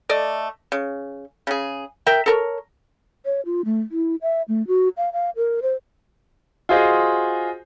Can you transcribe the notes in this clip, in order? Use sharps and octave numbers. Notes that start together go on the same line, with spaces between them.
A3 D5 D#5
C#3
C#3 G#4
A#4 E5 G5
A4 A#4 C#5
C#5
F4
A3
E4
E5
A3
F#4
F5
F5
A#4
C5
F4 F#4 G#4 C5 D#5 F5